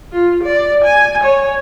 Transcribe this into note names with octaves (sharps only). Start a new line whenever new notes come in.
F4
D5
G#5
C#5